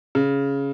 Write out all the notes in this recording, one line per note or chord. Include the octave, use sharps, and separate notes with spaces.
C#3